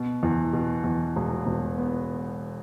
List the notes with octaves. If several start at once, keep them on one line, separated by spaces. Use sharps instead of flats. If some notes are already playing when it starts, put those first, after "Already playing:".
Already playing: B2
E2
B2
E2
E1
E1
B3